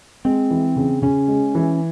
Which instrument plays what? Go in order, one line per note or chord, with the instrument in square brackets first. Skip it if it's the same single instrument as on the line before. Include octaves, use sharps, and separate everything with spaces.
[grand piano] G#3 [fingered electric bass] C4
[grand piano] E3
C#3
[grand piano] C#3 [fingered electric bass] C#4
[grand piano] G#3
E3